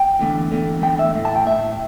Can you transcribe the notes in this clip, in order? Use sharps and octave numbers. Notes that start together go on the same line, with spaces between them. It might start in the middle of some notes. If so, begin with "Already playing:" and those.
Already playing: G5
E2 D3 A3
E2 D3 A3
E2 D3 A3 G5
E5
A2 A3
A5
G5
A2 A3 E5